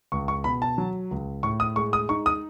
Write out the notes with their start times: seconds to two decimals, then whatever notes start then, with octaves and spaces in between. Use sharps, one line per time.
0.12 C#2 C#6
0.28 C#6
0.44 B2 B5
0.62 A5
0.78 F#3
1.11 C#2
1.43 A2 C#6
1.60 D#6
1.76 G#3 C#6
1.93 D#6
2.09 D#4 C#6
2.26 D#6